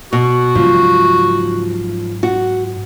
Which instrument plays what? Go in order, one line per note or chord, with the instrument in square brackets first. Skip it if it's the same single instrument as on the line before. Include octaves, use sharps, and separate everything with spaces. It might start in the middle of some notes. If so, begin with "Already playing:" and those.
[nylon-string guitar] B2 [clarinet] F#4
[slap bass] G#2 C#3 F#3 [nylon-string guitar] F3
[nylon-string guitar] F#4